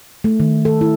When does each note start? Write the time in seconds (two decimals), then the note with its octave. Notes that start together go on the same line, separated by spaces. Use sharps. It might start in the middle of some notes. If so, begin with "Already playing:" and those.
0.24 A3
0.40 D#3
0.65 A4
0.81 E4